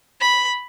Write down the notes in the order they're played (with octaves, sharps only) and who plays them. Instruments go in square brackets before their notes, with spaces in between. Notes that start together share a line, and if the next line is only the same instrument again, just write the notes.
[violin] B5